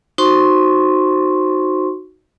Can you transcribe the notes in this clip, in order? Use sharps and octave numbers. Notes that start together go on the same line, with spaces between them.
D#4 F#4 C5 C6 C#6